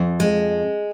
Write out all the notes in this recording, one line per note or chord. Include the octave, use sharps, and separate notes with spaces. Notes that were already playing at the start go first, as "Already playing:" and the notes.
Already playing: F2
G#3